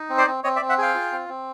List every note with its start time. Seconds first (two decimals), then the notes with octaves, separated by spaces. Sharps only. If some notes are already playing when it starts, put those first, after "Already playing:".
Already playing: D#4
0.10 C4
0.18 C5 D5
0.27 C4
0.44 C4 C#5 D#5
0.56 D5 E5
0.61 C4
0.69 E5 F#5
0.78 G#4 F5 G5
0.94 F4
1.12 C4
1.29 C4